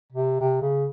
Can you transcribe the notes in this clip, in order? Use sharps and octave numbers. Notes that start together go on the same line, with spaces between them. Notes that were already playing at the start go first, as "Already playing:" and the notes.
C3
C3
C#3